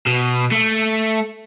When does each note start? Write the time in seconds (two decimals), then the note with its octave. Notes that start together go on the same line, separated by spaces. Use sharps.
0.07 B2
0.52 A3